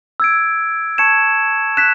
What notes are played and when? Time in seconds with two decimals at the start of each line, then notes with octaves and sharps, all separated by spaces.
0.20 E6 G#6 D7
0.98 A5 C#6 G#6 C#7 E7
1.77 F#6 B6 E7